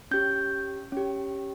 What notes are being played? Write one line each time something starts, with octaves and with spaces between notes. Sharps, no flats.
C#4 G4 G6
C#4 G4